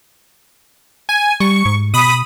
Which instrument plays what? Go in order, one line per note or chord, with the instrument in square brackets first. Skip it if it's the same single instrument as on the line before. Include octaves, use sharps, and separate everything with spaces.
[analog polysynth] G#5
[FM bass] G3 [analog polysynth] C#6
[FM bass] G#2
[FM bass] B2 [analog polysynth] B5 D#6